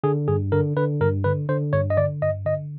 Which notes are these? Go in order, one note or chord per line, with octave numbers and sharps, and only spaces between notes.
D3 G#4
G2 G#4
D3 A#4
D3 B4
G2 A#4
D3 B4
D3 C5
G2 C#5
D#5
D3 D5
G2 D#5
D3 D#5